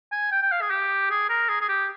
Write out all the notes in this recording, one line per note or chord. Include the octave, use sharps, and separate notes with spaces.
G#5
G5
G5
F5
G#4
G4
G#4
A#4
G#4
G#4
G4